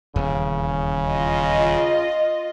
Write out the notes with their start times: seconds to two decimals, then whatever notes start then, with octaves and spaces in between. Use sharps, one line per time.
0.16 D#1 E2 C#3
1.10 F4 D#5